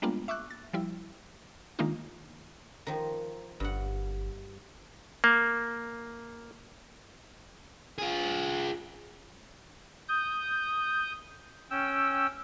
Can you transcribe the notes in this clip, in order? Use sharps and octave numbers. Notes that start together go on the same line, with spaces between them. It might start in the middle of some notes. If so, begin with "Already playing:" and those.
G3 G#3 A#3 B3 D4 F4
E5 C#6 D6 E6 F#6
A6
F3 G3 E4
D#3 G#3 A#3 D4 D#4 F4
D#3 F3
G1 G2 F#5
A#3
F4 G#4
D#6 G6
C#4 G5 E6